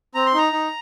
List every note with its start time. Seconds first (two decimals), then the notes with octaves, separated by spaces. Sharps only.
0.15 C4 A#5
0.26 C6
0.34 D#4 A#5
0.53 D#4